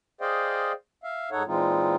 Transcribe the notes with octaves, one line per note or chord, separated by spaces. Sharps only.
G#4 C5 D5 D#5 F5 G5
E5 F5
G#2 D#4 A4 C#5 F#5
A#2 E3 G#3 C4 D#4 F4